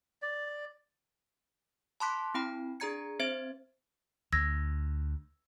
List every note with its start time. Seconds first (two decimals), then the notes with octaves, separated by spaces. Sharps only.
0.22 D5
2.00 A5 B5 C6 D6 F#6 B6
2.34 C4 E4 G5 B5
2.80 D4 G#4 D5 A#5 G#6 C#7
3.20 C4 C5 E5 G#6 A6
4.33 D2 E6 G#6 A#6